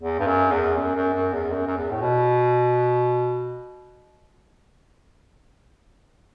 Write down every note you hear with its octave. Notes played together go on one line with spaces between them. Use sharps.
E2
G2
F#2
E2
F#2
F#2
F#2
E2
F#2
F#2
E2
A2
B2